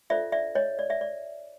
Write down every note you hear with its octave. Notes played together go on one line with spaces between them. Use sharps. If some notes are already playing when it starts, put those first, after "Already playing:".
D4 F4 A4 C5 D5 E5
D5 E5
C#5 D#5
D5
D5 E5
D5